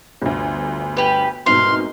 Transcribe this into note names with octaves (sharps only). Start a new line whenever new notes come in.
G1 D2
G4 B4
C2 G#2 B2 F5 C6